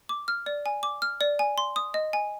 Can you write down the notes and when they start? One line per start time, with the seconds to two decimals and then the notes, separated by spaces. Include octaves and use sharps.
0.09 D6
0.28 F6
0.46 D5
0.66 G#5
0.83 D6
1.02 F6
1.21 D5
1.39 G#5
1.58 C6
1.76 D#6
1.94 D#5
2.13 G#5